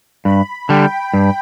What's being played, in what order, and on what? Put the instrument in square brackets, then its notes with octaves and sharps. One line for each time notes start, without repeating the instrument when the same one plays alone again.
[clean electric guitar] G2 [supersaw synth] B5
[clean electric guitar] D3 G3 [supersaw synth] G5
[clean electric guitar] G2